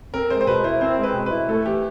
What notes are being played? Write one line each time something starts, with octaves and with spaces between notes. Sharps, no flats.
C4 A#4
G#3 C5
C5
B2 B4
E4 C5
C4 C5
G#3
B4
B2
B4
E4
A3 A4
E3 G4